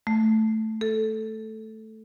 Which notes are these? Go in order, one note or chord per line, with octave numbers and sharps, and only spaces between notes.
A3
A4